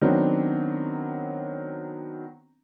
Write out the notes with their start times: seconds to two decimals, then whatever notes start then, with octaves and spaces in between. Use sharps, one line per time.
0.01 D#3 F#3 B3 C4 D4